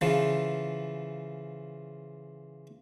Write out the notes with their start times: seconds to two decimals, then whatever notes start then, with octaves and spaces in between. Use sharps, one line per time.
0.01 C#3 E3 F3